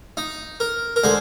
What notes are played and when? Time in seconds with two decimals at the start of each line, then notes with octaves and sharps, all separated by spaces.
0.17 D#4
0.60 A#4
0.96 A#4
1.03 D3 G#3 C5